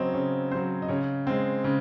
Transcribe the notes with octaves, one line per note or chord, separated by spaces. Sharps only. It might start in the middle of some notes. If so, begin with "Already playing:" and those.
Already playing: C#3 F#3 C4 C#5 D#5
C#3 C#5
F#3 C4 C5
D#5
C#3 C#5
G#3 C4
C#3